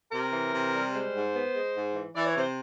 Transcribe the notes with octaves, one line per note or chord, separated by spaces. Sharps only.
C3 A#4
E3
C3
G3
G#3 C5
G#2
B3
G#3
G#2
E3
E3 D5
C#5
C3 C5